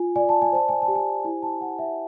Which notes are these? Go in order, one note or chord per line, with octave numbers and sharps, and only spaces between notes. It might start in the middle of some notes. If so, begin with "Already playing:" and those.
Already playing: F4 G#5
D5 G#5
A5
G#5
C5 A5
G#5
A5
G4
G#5
E4 G#5
A5
C5 F#5
E5